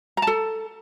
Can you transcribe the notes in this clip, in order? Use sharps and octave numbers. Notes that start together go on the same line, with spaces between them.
A4 A5 A#5